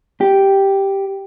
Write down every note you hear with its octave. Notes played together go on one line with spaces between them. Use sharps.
G4